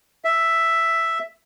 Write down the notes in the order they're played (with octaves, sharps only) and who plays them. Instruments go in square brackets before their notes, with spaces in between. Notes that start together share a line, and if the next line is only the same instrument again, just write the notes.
[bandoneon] E5